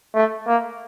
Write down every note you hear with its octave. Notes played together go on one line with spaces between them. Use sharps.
A3
A#3